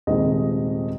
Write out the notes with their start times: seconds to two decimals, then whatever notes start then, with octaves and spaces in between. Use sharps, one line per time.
0.07 D#1 C3 D#3 G#3 D#5